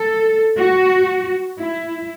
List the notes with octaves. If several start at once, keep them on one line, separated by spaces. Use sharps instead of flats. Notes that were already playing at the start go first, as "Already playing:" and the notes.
Already playing: A4
F#4
E4